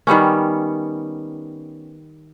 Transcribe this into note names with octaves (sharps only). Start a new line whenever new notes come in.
D#3 G3 B3 C#4